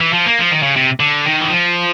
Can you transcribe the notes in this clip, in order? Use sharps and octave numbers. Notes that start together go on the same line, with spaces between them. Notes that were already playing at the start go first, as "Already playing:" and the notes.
E3
F3
A#3
F3
D#3
C#3
C3
D3
D#3
E3
F3